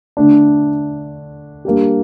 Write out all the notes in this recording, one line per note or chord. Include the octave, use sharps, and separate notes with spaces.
D3 A3 D4
G3 A#3 D4 G4